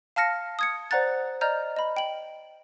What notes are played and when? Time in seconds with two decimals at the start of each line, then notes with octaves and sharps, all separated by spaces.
0.16 F5 A5 F6 A#6 C#7
0.59 D#6 G#6 C#7
0.91 C5 D5 F#5 A#5 F#6 A6
1.41 D5 D#5 A#5 F6 G6
1.76 D#5 B5
1.97 G5 F#7